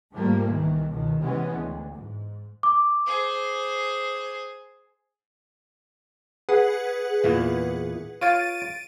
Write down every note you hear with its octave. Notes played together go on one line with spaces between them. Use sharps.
G#2 F3 G3 A3 A#3
C2 D#3 E3
C#2 B2 D#3
C3 E3 G#3 B3 C#4
D2
G#2
D6
G#4 C5
G#4 B4 F#5
E2 A#2 E3
F4 C#5 F5 A6 D7 D#7